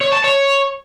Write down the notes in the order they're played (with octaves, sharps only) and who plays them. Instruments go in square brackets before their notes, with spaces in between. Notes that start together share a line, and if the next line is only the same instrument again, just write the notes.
[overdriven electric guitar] C#5
A5
C#5